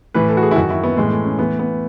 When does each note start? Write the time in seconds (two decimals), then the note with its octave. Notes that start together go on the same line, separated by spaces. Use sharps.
0.14 A2 E3 B4
0.29 A4
0.37 F#4
0.43 G#4
0.51 E4
0.56 F#2 D#3 F#4
0.70 E4
0.83 B3
0.97 A2 E3 G#3
1.11 A3
1.24 C#4
1.38 A2 E3 B3
1.59 B3